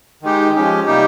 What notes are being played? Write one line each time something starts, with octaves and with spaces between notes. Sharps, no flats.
D#3 G#3 D#4 G4
F3 G#3 C#4 G4
C3 G3 A#3 D#4 G4